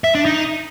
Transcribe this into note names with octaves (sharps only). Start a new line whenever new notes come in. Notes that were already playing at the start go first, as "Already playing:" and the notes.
E5
D4
D#4